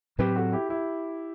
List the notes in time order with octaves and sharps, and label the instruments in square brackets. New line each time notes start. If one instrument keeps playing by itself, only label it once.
[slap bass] A2 F#3 C4 [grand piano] G4 B4
[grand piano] F#4 A4
E4 G4
E4 G4